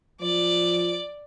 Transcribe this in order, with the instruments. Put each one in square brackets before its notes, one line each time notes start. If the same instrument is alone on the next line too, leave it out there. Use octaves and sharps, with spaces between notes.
[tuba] F3 [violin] D5